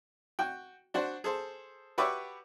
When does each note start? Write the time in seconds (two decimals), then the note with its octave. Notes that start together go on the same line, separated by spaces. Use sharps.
0.39 F#4 G5
0.94 D4 F#4 C5
1.24 G#4 A4 C5
1.98 F#4 G4 B4 C#5 D5 E5